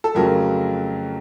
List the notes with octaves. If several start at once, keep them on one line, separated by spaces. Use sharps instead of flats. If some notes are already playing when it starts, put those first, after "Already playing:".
A4
F2 C#3 F#3 A3 A#4